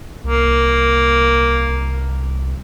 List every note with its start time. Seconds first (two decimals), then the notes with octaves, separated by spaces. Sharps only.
0.24 C2 A#3